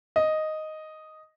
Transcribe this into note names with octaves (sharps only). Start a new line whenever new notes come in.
D#5